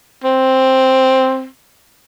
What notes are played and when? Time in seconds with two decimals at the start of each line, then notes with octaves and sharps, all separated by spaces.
0.24 C4